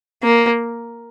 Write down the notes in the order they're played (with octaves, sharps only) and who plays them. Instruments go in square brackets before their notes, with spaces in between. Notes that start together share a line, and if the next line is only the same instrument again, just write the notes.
[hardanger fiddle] A#3